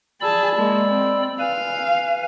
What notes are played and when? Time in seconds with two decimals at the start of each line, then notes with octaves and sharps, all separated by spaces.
0.21 G#4 D5 A5 B5 E6
0.56 G#3 A#3
0.91 C4
1.40 B4 F5 G#5